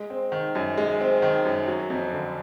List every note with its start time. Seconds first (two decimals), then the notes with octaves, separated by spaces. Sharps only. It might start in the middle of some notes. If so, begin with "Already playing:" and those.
Already playing: G#3
0.10 C4
0.32 D#3
0.55 F#2
0.78 G#3
1.00 C4
1.22 D#3
1.45 F#2
1.67 F#3
1.90 F2
2.12 D3